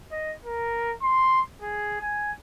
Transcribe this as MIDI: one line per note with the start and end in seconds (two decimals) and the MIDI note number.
0.11 0.33 75
0.45 0.94 70
1.02 1.41 84
1.62 2.01 68
2.01 2.31 80